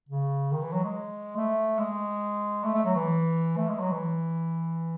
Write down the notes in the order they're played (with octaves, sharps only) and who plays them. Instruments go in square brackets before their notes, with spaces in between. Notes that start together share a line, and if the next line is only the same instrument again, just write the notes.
[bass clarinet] C#3
D#3
E3
F#3
G#3
A3
G#3
A3
A3
F#3
E3
A3
G#3
F#3
E3